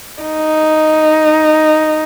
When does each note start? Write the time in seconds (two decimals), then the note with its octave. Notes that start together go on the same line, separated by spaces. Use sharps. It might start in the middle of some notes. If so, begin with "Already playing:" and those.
0.23 D#4